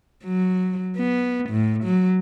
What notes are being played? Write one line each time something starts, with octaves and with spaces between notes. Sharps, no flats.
F#3
B3
A2
F#3